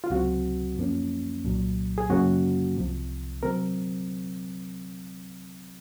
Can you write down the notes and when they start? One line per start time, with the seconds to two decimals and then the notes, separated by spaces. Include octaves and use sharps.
0.04 F4
0.10 C#2 C3 F#3 C4 F#4
0.77 F#2 F3 A#3 C#4
1.44 C2 A#2 F#3
1.98 G#4
2.10 F#2 C#3 F#3 A#3 C#4 F#4
2.77 C2 C3 F3
3.43 C3 F#3 C4 A#4